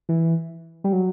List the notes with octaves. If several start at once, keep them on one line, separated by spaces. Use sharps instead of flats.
E3
G3
F#3